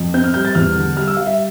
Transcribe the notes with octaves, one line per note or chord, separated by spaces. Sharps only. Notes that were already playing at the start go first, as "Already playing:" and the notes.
Already playing: F2
C4 G6
F6
G3 G6
A6
E2 F6
D3
G3 F6
E6
G3 F5
E5